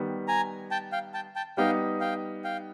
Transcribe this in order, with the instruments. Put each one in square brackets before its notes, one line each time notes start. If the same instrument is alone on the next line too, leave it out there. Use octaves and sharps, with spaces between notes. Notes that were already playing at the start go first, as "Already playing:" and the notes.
Already playing: [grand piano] D#3 G3 B3
[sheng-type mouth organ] G#5 A#5
G5 A5
F5 G5
G5 A5
G5 A5
[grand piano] G3 B3 D#4 [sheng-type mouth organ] F5 G5
[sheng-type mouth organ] F5 G5
F5 G5